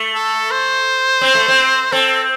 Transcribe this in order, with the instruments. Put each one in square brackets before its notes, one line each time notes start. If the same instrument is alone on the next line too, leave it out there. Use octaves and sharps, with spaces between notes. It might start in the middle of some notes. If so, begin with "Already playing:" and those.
Already playing: [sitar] A3
[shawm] A4
C5
[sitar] C4
A3
C4
[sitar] C4 [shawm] A4